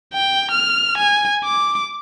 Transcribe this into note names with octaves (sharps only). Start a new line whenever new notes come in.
G5
F6
G#5
D6